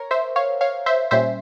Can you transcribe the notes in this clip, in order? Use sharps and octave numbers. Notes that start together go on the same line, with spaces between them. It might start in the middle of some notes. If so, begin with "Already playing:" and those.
Already playing: A#4 C#5
C5 E5
C#5 F5
C#5 F5
C5 E5
A#2 G3 C#4 C5 E5